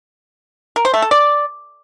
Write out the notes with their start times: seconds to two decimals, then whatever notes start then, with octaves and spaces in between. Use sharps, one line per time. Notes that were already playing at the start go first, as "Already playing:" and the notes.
0.76 A#4
0.85 C5
0.94 A3
1.02 A4
1.11 D5